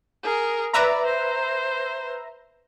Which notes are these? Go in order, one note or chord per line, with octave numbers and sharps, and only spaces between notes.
G#4 A#4
B4 D5 E5 A#5
C5